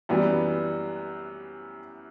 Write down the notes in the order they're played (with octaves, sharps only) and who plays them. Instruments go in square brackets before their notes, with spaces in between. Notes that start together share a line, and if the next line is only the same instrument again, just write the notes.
[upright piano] F#2 E3 G3 B3